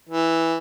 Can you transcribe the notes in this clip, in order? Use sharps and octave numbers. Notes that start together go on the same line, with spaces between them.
E3